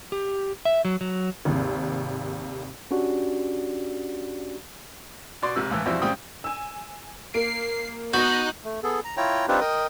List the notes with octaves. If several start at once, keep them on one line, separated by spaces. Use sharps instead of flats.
G4
E5
F#3
F#3
G#1 D#2 C3
C#4 D4 F#4 G4 D5
B2 D5 C6
G#1 C3 E6
C#2 A2 E3
F2 B2 E3 G3 C4 E4
G#2 C#3 G3 C4 G5 D#6
G#5 E6
A#3 C7 D7
B3 D#4 F#4 D#5 F#6 G6 F#7
A3
B3 G#4 A4
A#5
E4 F4 C#5 G5 A#5
C4 D4 D#4 F4 G4 B4
A#4 D#5 G5 D#6